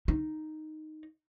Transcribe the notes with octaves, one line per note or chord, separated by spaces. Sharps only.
D#4